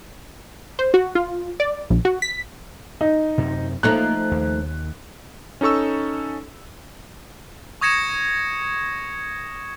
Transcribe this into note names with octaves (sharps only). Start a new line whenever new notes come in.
C5
F#4
F4
D5
A#1
F#4
B6
D#4
F#2 C3
F3 A3 A#3 D#4 F#6
D#2
C#4 D#4 A4 C#6 E6
C#6 D#6 G#6 A#6 C#7 E7